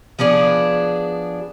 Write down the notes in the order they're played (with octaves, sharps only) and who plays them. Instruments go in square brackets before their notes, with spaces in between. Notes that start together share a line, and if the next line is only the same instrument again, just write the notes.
[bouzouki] F3 B3 D4 G#4